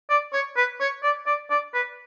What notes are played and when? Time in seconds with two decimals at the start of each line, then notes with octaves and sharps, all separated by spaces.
0.10 D5
0.33 C#5
0.57 B4
0.80 C#5
1.03 D5
1.26 D5
1.51 D5
1.74 B4